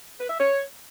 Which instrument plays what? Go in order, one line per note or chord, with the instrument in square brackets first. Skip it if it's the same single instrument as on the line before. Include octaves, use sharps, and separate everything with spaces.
[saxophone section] B4
E5
C#5